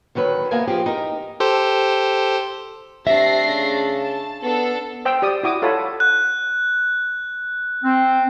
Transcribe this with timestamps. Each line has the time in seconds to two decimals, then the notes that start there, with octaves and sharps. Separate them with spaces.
0.15 D3 D#3 F#3 B4
0.51 C3 A#3 B3 A#4 F5 G#5
0.67 F3 C4 G4 G#4
0.86 D#4 G4 A#4
1.40 G4 A4 C5
3.07 C3 A3 D4 E5 A#6 C7
3.46 C#3
3.97 A5
4.43 B3 D4 A4
5.05 C5 G5 E6
5.22 G4 D5 D#6
5.43 E4 F#4 D6 D#6
5.62 F4 A4 C#5 F#5 A5 B5
6.00 F#6
7.84 C4